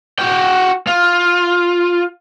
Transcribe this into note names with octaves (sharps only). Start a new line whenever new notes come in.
F#4 G5
F4